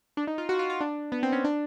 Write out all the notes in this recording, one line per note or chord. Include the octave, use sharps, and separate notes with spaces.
D4
D#4
F4
F#4
F4
F4
D4
B3
C4
C#4
D4